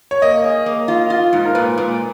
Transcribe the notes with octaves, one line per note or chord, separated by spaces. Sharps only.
C#5
A#3 D#5
G#4
A#3
F4
F4
G#2
A#4
A#2 B4
A#2